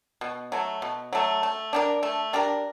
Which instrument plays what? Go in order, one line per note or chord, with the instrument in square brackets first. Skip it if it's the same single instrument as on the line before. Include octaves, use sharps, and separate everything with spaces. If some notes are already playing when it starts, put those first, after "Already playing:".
[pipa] B2
F#3 A3
B2
F#3 A3
A3
D4 G4 A#4
A3
D4 G4 A#4